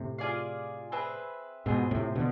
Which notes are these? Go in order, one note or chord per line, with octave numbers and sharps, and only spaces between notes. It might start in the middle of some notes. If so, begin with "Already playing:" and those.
Already playing: A2 C3
F4 G#4 D5 F5
C4 G#4 B4 E5
G#2 B2 C4 F4 G#4 C5
A2 C3
B2 D3